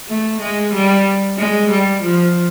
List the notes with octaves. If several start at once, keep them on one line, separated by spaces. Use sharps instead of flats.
A3
G#3
G3
G#3
G3
F3